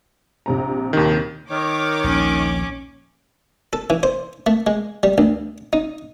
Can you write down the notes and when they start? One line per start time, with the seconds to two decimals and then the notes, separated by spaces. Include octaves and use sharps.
0.46 A#1 C3 A#5
0.93 D#2 D#3
1.51 D#3 C#5 D6
2.04 A#1 D#2 C#4
3.73 A4
3.90 E3
4.03 C5
4.46 A3
4.67 G#3
5.03 G3
5.18 D2
5.73 D#4